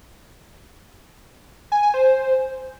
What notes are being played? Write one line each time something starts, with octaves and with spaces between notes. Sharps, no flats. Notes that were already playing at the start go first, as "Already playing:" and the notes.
G#5
G#5
C5